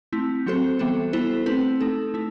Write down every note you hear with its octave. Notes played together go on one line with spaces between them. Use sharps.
A3 C4 E4
F#3 C4 F#4 A4 C5
E3 G3 B3 F#4 A4
B3 E4 A4 C5
A3 C4 E4 B4
A3 D#4 A4
A3 E4